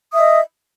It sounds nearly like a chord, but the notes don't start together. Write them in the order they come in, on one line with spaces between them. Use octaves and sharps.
D#6 E5 D#5